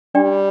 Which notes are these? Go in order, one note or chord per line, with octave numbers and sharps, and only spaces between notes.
G3 D4 G4 D5 G5